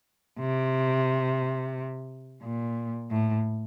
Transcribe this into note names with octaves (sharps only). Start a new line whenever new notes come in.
C3
A#2
A2